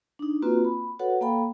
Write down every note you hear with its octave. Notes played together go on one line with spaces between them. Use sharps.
D4 D#4
A#3 C4 F4 F#4 B4
B5
F#4 A4 B4 C#5 F#5
A#3 A4 F5 G5 B5